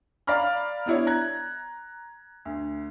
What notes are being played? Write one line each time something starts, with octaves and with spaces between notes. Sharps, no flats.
D5 F5 A#5 B5 F6
B3 D4 E4 C#5
A#5 F#6 G#6
D2